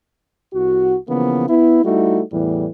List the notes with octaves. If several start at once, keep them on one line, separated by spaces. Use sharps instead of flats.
C2 F#4
C#3 E3 F3 A#3 B3
B3 E4
G3 A3 D#4 E4 F#4
E2 A2 E3 G3